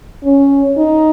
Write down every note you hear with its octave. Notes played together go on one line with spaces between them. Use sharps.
C#4
D#4